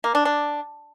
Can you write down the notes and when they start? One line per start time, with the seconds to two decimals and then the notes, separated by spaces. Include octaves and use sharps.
0.04 A#3
0.15 D4
0.25 D4